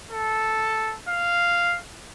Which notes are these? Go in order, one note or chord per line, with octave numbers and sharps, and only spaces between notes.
A4
F5